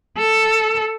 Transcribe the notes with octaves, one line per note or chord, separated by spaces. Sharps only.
A4